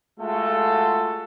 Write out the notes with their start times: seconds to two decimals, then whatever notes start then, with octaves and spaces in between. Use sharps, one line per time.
0.19 G#3 A3 F4 F#4 A4